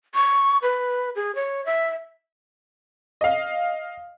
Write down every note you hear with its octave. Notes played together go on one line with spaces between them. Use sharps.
C#6
B4
G#4
C#5
E5
D#5 F5